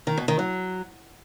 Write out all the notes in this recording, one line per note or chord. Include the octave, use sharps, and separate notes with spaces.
D#3
B2
D#3
F#3